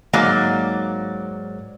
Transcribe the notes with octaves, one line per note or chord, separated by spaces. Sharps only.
G#2 F#3 A#3 D5